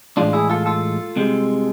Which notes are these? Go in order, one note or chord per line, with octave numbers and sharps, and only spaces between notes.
A2 E3 G#3 D4 F4
E4 G#4
F4 A4
F4 A4
C2 C3 G#3